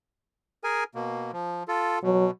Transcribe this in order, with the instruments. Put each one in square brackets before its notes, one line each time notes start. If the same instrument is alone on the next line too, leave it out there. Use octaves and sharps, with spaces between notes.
[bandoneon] G#4 A#4 G#5
B2 A#3
F3
F4 A4
[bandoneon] B2 [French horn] F#3